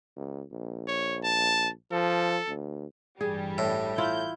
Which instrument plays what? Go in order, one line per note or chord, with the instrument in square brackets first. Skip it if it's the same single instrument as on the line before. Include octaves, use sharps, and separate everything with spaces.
[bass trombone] C#2
A#1
[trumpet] C#5
A5
[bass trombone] F3 [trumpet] A4
[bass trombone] D2
[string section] A1 G2 G3 [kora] G#4
[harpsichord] A2
[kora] E4 F4 [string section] G6